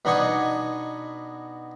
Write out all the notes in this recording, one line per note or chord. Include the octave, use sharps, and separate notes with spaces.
B2 B3 D4 D#4 G#5 C#6